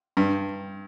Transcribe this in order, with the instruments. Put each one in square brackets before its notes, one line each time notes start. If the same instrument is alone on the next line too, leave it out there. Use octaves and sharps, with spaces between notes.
[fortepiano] G2